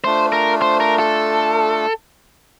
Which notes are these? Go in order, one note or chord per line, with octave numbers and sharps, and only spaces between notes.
A3 D4 F4 C5
A#4
C5
A#4
A4